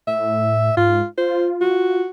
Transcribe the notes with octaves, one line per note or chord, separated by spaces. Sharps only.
A2 E5
G#2 F4
F4 C5
F#4